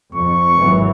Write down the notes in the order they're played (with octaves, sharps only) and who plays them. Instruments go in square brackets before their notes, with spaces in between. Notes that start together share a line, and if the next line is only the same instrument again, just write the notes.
[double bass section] F2 [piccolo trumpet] C#6
[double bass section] G#1 E3 F#3